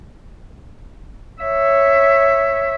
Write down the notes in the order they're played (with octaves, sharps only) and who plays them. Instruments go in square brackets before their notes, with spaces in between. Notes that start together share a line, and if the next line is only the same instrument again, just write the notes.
[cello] C#5 E5